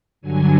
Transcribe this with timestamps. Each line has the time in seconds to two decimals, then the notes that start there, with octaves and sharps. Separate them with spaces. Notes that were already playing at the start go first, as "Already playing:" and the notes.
0.21 G2 D3 F#3 G#5